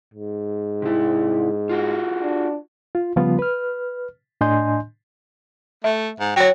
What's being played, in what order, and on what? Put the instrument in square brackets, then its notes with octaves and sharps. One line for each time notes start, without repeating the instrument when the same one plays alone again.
[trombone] G#2
[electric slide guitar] C3 E4
F4 F#4 G#4
[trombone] D4
[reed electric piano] F4
C#3 F3 G3 B3 F4
B4 F6
A2 D4 D#5 G#5 C6 G6
[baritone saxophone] A3 [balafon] E5
[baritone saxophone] G#2
[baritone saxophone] F#3 [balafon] C#5 G5